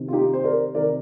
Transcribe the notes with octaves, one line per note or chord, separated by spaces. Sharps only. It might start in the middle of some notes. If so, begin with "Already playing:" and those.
Already playing: C3 D#3
F4
D#4 G4
C5
A#4 D5
C3 D#3 A#4 D5